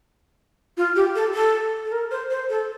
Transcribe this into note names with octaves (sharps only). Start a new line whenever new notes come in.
F4
G4
A4
A4
A4
A#4
C5
C5
A4